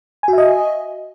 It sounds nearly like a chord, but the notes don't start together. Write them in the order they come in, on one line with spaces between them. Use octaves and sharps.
G#5 F#4 E5 D#5